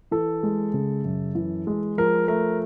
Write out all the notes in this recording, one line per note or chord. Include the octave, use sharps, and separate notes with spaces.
E3 A4
G#3
C#3
F#2
E3
G#3
F3 A#4
A3 A#4